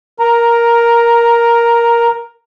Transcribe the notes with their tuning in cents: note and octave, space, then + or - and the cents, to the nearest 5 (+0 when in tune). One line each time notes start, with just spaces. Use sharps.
A#4 +10 A#5 +0